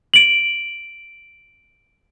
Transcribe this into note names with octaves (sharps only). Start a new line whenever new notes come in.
D7 F#7